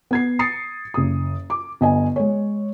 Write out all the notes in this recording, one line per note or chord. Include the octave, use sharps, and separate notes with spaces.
B3 G#6 C7
D#6 A6 C7 C#7
F#1 D#6
D6
G1 D#5 G#5
G#3 C#5